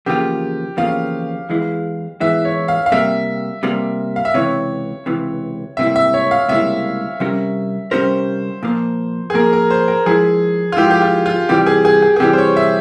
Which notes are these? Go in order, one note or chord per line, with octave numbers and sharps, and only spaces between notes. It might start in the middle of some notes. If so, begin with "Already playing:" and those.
E2 C#3 F3 A#3 F4 G4
E2 C#3 F3 A#3 F4 F5
E2 E3 G#3 E4
E2 E3 G#3 E4 E5
C#5
F5
F5
C3 G3 A#3 E5
C3 G3 A#3
F5
E5
C#2 C3 E3 C#5
C#2 C3 E3
C#2 C3 G3 A#3 E4 E5
E5
C#5
F5
C#2 C3 G3 A#3 E4 E5
C3 G3 C#4 G4 A#4
C3 G3 C#4 G4 A#4 C5
A#2 F3 A#3
G#4
A#2 F3 A#3 A#4
A#4
C5
A#4
F3 G#3 E4 G#4
F4
F3 G#3 E4 G4
G4
F4
F4
C3 E3 G3 G4
G#4
G#4
G#4
G#4
C3 E3 G3 G4
C5
C#5
E5